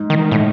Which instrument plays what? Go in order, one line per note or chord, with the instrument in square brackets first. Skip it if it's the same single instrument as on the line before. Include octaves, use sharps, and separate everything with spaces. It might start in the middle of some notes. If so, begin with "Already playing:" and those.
Already playing: [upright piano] G#2
[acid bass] D#3
A2